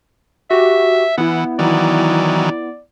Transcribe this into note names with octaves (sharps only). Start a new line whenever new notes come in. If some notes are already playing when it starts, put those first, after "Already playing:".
F#4 G4 E5
E3 B3 E4 F#5
D#3 E3 F#3 D5